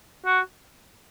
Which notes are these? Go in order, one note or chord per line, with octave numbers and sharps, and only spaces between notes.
F#4